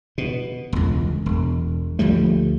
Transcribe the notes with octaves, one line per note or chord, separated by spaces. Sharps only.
B2
E1 C#2
E1
D2 F3 G3 A3